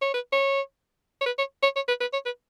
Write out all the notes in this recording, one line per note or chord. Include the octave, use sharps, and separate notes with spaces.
C#5
B4
C#5
C#5
B4
C#5
C#5
C#5
B4
B4
C#5
B4